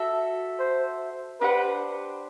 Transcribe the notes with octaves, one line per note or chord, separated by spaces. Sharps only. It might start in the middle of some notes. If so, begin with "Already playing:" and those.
Already playing: F#4 A4 E5
C5
D4 G4 B4 C5 F#5